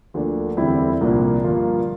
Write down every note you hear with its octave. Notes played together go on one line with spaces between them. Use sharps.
D2 D3 F3 A#3 D4
E2 D3 G3 C4 E4
C2 A#2 F3 A#3 D4
G2 F3 A#3 F4